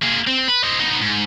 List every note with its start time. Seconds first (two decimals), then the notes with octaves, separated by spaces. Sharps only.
0.03 A#3 G#4
0.27 C4
0.48 B4
0.64 C4 D#5
0.79 B3 D#4
1.01 G#2